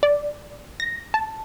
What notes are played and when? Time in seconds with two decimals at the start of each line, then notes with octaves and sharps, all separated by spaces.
0.03 D5
0.80 A#6
1.14 A5